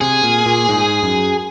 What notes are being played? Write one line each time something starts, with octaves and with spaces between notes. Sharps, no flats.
C3 G#4
A#2
A#2
G#2
F#2